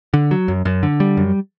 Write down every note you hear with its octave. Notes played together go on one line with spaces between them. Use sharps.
D3
F#3
F#2
F#2
D3
G3
F#2